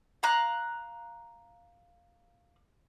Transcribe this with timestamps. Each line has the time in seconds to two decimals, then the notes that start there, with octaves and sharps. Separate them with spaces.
0.23 F5 A#5 F#6